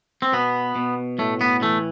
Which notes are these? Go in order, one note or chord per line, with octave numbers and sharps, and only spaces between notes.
C4
B2 B3
B2
A2 A3
B3
E3 A3